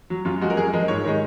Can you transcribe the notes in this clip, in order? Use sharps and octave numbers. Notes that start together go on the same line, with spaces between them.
F#3
F#2 F4
F3 G#3 F#4
A#4
F#2 G#4
F3 G#3 A#4
G#2 C#5
D#3 G#3